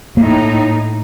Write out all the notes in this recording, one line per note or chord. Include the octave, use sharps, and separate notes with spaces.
A2 A#3 D#4